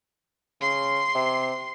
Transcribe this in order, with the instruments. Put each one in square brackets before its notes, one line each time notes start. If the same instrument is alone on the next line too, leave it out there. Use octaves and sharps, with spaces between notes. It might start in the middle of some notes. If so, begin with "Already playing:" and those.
[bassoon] C#3 [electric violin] C6 C7
[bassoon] C3